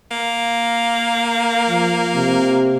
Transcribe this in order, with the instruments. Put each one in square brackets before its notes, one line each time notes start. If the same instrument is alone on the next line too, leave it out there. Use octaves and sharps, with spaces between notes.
[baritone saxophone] A#3
[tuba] F3
C3